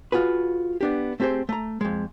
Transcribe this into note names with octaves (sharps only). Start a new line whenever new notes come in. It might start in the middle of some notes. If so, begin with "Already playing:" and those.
F4 F#4 G#4 B4
B3 D4 G4
A3 C4 G4 G#4 C5
A3 A#5
F2 G#3